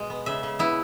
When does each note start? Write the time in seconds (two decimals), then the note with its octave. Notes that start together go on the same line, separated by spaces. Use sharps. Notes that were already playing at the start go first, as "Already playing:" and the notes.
Already playing: B2 G#3
0.10 B3
0.26 C#3 E5
0.43 C#3
0.59 B3 E4